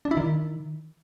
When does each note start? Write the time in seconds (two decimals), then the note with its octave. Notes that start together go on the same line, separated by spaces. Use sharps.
0.05 D4
0.11 E4
0.17 D#3